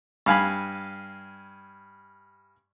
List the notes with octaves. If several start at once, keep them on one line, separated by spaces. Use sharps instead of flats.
G2 F5 G#5 B5